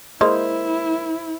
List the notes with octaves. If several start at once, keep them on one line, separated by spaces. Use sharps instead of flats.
G#3 A#3 E4 C5